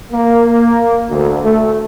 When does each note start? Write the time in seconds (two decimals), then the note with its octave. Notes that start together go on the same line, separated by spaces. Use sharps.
0.12 A#3
1.10 D2
1.43 A3